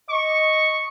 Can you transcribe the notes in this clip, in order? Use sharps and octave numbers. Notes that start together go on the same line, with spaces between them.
D#5 C#6